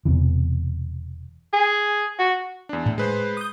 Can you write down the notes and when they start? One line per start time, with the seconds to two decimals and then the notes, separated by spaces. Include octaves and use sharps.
0.05 E1 E2 C3 E3
1.53 G#4
2.19 F#4
2.69 E2 D4
2.86 A2
2.98 G#3 B4 C5
3.37 D#6 G6